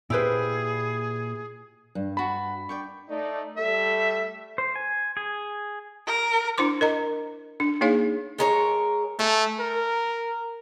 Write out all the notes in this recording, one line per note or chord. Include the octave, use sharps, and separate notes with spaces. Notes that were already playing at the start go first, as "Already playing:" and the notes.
A#2 E4 G4 G#4 B4 C5
G2
F#4 A5 B5
D5 G5 C#6
A3 D#4 D5
G3 A3 A4 E5
C5
G#5
G#4
A#4
D4 E4 C5 C6 D6
A#4 D#5 A#5
D4
A#3 D#4 G#4 C#5 F5
G#3 A#4 C#5
A3 G#5
A#4